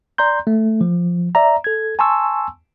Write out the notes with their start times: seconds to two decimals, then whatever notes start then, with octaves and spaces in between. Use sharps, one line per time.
0.18 D5 A#5 C6 G6
0.47 A3
0.81 F3
1.35 D5 E5 A#5
1.64 A4 G#6
1.99 G#5 A5 C6 C#6 E6